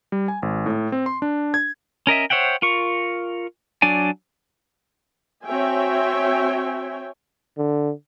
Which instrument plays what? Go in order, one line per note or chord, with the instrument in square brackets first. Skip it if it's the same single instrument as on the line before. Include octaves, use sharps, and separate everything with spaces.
[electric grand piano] G3
G#5
G#1
A2
C4
C6
D4
G#6
[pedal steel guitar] C#4 A#4 D#5 E5
C5 C#5 E5 F#5 G5
F4 A#4 C#6
F#3 D4 D5 G#5
[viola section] C4 F#4 C#5 E5 G5 G#5
[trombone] D3